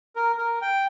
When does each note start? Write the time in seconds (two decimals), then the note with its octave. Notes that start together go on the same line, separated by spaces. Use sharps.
0.16 A#4
0.38 A#4
0.62 G5